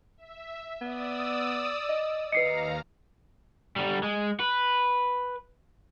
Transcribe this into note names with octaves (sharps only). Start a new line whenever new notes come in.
E5
B3 D5 D#6 E6
D#5
D#2 B4 D#5 F5 A#5 C7 C#7
D3 G3
G#3
B4